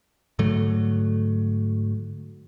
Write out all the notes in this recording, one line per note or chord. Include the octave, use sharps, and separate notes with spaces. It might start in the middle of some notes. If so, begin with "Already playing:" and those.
G#2 D3 F#3 A3